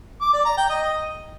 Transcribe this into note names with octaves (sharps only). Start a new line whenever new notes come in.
D6
D5
A#5
G5
D#5